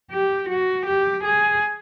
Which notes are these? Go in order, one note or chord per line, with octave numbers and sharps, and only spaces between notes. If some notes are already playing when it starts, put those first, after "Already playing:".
G4
F#4
G4
G#4